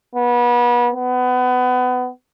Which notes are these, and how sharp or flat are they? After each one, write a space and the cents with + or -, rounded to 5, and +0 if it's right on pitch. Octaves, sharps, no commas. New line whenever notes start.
B3 -30
B3 +25